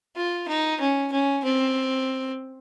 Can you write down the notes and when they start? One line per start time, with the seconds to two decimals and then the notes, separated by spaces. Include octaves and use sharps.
0.16 F4
0.48 D#4
0.80 C#4
1.12 C#4
1.44 C4